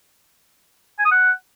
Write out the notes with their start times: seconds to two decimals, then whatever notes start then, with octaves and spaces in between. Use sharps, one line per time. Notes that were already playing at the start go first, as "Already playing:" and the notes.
0.99 G#5
1.05 D#6
1.11 F#5